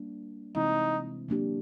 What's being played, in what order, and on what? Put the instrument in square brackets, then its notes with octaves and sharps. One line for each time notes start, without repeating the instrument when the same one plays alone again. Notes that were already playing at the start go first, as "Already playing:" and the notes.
Already playing: [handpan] G3 A#3 D4
[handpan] C3 E3 G#3 C4 E4 [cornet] D#4
[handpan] F#3 A#3 D4 G4